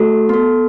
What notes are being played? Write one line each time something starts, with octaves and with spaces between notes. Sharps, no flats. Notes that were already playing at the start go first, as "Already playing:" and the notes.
Already playing: A3 F#4 A4
B3 A4